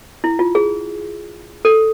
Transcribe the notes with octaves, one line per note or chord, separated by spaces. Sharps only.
E4
F4
G#4
A4